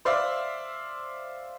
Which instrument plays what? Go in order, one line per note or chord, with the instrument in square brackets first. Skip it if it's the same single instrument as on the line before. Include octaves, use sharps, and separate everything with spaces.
[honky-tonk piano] C5 D5 E5 F5